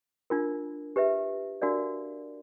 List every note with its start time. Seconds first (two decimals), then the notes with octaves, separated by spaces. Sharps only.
0.30 D4 F4 A#4
0.96 G4 B4 E5
1.62 D4 F#4 A#4 D5 F5